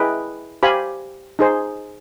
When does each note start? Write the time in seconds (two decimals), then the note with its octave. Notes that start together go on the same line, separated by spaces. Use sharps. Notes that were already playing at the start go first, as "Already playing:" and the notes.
Already playing: E4 G#4 B4 D#5 G5
0.63 G4 C5 F5 G#5 B5
1.39 D#4 G#4 C5